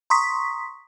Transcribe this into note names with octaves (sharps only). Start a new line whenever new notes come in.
A#5 C6 C#6 D#6 B6